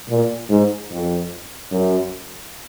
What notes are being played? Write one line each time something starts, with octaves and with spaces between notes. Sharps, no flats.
A#2
G#2
F2
F#2